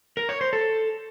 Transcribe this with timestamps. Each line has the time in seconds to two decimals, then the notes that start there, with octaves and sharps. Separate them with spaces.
0.17 A#4
0.29 C#5
0.41 C5
0.53 A4